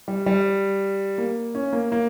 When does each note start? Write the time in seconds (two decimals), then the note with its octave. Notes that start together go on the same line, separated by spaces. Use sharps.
0.08 G3
0.26 G3
1.18 A#3
1.55 C#4
1.73 A#3
1.92 A#3